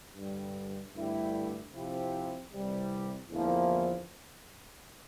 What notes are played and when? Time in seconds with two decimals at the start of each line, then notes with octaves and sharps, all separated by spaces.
0.15 G2 D3 G3
0.94 G2 D3 A3 E4 G4
1.72 C3 F3 C4 E4 G4
2.51 C2 C3 E3 G3
3.29 E2 D3 F3 A#3 E4